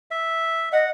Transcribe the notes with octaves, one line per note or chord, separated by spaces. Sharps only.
E5
D#5 F#5